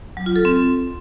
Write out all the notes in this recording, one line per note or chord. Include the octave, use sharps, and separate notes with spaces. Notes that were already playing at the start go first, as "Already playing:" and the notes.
F#3
F4
A4
C4